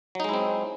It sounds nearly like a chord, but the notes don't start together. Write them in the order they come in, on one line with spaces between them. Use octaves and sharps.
F#3 D#4 G#3 E4 C4